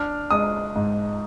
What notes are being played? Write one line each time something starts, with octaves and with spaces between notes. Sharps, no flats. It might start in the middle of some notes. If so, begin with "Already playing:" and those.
Already playing: D4 F6
G#3 D#6
G#2